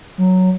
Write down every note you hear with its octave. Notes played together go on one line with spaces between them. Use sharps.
F#3